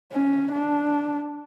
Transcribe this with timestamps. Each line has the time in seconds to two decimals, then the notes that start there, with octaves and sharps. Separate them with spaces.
0.13 C#4
0.52 D4